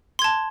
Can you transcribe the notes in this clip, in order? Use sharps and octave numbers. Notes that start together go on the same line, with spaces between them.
A5 C6 G#6